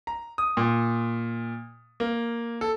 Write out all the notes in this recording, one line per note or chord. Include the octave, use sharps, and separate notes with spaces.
A#5
D#6
A#2
A#3
A4